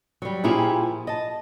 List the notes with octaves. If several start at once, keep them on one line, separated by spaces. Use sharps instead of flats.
F#3 G3
A#2 F3 E4 G4 G#4
D#5 A5